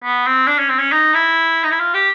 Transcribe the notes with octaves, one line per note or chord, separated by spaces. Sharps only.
B3
C4
D4
C#4
C4
C#4
D#4
E4
D#4
E4
F4
G4